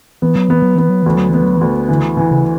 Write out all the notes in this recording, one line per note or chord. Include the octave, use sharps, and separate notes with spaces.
E3 B3
F#3
E3 B3
F#3
E3 B3
F#3
D2 E3
F#3
E3 B3
F#3
E3
D2
D3 E3
E3
C#3